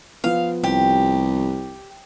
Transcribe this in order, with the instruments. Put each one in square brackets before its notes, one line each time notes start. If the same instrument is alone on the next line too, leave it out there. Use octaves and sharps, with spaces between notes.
[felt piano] F3 B3 [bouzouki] F5
[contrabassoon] C2 [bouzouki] G4